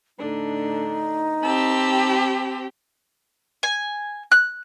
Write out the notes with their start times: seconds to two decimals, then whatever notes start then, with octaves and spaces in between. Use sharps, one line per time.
0.19 A2 D3 D4 D#4
1.42 C4 G4 A5 B5 E6
3.63 G#5
4.32 F#6